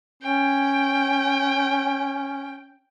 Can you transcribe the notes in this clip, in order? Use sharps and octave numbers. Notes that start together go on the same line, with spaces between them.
C#4 G5